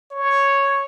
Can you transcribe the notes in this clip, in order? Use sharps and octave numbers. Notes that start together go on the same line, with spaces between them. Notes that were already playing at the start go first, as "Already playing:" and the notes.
C#5